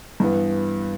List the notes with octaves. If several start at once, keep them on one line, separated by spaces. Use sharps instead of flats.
G2 E3 B3